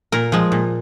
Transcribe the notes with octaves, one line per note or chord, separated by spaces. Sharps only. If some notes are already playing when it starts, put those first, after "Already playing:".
A#2 A#4
F3 G#3
A#2